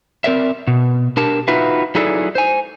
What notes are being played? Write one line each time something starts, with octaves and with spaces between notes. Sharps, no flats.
C4 A#4 D5 E5
B2
D4 G4 A#4 A5
D#4 F4 F#4 B4 E5
F#3 D#4 E4 G#4 A4 D5
C5 G#5